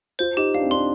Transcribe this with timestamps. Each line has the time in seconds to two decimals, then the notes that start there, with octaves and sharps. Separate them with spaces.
0.19 F4 C5
0.37 D#4 G4
0.55 D4 F5
0.63 C4
0.71 D4 C6